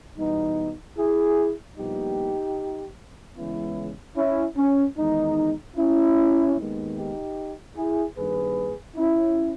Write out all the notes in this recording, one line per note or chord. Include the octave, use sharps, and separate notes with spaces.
E2 B2 G3 B3 D#4
E4 G#4
A#1 A#2 G3 B3 D#4 G4
C#2 C#3 E3 G#3 B3 C#4 E4
C#4 E4
C#4
E2 D#3 G#3 D#4
C#4 E4
D#2 D#3 G#3 B3
D#4 G4
E4 G#4
G2 D#3 A#3 G#4 B4
C#4 E4